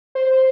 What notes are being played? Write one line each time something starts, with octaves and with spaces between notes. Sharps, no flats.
C5